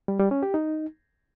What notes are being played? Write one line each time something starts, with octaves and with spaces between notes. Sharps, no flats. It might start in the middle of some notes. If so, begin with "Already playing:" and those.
G3
G3
C#4
G4
D#4